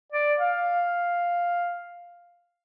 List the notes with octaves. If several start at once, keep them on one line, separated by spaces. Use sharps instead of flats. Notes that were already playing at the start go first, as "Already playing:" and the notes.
D5
F5